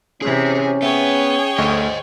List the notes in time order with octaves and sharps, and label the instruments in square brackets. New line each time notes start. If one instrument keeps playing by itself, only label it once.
[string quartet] C3 E3 [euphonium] C#4 [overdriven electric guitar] G#4
[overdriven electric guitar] B3 [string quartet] G#4 C#5 G5 [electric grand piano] E5
[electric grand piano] D2 A3 C#6 [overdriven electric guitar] C5 D#5